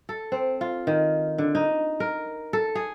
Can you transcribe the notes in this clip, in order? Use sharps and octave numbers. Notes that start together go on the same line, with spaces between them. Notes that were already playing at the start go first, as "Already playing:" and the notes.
A4
C4
F4
D#3
D3
D#4
A#4
A4
G#4